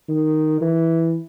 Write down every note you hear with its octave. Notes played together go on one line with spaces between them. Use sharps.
D#3
E3